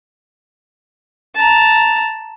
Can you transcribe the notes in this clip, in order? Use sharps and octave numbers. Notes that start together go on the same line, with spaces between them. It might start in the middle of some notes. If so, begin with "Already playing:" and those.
A5 A#5